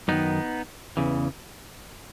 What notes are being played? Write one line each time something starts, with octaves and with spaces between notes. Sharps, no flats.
F#2 D#3 B3 D#4
E2 C#3 E3